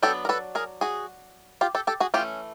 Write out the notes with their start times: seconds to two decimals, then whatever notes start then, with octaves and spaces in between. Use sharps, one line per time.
0.02 F#3 B3 D4 G4 A4
0.25 A#4
0.29 A4 B4
0.55 G#4 A#4
0.81 F#4 G#4
1.61 F4 G4
1.75 G4 A4
1.87 G4 A4
2.00 F#4 G#4
2.14 E3 A3 C#4 F4 G4